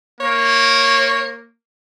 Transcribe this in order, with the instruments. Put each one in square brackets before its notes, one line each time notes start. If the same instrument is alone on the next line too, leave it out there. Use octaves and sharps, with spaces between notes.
[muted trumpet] A#3 [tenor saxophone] C#5